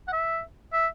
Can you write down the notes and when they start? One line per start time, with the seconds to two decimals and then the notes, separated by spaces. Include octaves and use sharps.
0.08 F#5
0.13 E5
0.73 E5